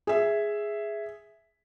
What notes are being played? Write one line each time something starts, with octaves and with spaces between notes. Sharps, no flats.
G#4 E5